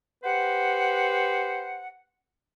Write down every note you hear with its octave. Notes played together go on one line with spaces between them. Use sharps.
G4 B4 C5 F#5